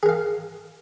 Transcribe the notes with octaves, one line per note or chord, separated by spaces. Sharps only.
G#4 A#4 F5